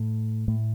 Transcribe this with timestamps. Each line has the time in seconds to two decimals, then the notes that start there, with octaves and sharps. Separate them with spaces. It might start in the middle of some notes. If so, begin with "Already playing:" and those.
Already playing: A2
0.48 A2 A3